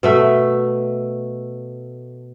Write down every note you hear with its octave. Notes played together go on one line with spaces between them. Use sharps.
B2 A3 E5